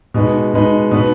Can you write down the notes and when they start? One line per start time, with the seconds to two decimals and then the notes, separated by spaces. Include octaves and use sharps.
0.14 B2 G#3 D#4 B4
0.54 B2 G#3 D#4 B4
0.91 B2 B3 D#4 B4